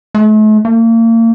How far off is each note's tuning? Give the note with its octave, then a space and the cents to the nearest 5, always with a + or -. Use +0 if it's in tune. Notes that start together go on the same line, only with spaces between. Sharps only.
A3 -40
A#3 -35